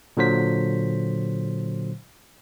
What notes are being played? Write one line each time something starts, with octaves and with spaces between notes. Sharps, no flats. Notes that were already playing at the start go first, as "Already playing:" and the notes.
A#2 D3 F#3 C5 B6